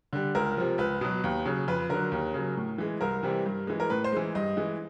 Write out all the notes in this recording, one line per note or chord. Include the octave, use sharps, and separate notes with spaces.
D3 G3
C#2 A#4
C3 F3
C#2 B4
B2 F#3
D#2
C#3 F#3
F2 B4
D3 F#3 A#4
D#2
C#3 F#3
A2
E3 G#3
C2 A#4
C3 E3 G3
G2
E3 G#3
A#4
A2 B4
C5
E3 G#3
G2 D#5
E3 G#3